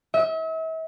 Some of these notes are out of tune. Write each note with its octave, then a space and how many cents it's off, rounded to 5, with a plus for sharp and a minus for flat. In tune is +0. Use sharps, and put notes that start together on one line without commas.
E5 -40